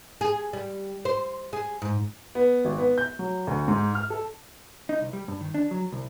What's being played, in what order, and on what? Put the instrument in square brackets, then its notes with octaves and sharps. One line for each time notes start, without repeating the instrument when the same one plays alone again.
[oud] G#4
G3
C5
G#4
G#2
[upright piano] B3
G#1
B3
G6
F#3
D2
G#2
F6
A4
[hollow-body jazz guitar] D#4
C2
G3
G2
D#3
D4
F#3
C2